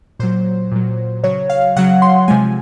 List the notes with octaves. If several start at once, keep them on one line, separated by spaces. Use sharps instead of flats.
A#2 F#3 C5
A#2 F#3
C#3 F#3 C#5
F5
C#3 F#3 F#5
C6
C3 F3 G#3 G#5